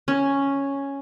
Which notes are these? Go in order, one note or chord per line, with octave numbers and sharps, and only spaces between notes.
C#4